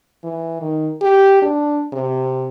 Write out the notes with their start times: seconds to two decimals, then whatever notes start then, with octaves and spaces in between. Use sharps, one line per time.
0.24 E3
0.61 D#3
1.02 G4
1.42 D4
1.93 C3